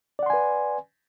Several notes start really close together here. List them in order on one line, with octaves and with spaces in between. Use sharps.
D5 F#5 C6 G#5 B4